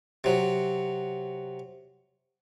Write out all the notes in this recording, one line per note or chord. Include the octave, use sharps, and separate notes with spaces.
C3 F#3